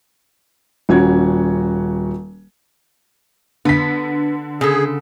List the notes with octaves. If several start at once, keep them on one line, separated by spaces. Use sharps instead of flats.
D#1 C#4 F#4 G#6
D3 B3 B6
C#3 G#4 A4